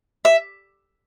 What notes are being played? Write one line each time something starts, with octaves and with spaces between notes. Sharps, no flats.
E5